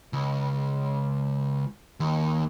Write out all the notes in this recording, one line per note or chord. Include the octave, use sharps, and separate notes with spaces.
C#2
D#2